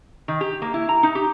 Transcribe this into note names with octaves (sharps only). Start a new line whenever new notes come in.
D#3
G4
A#3
E4
A#5
D#4
G4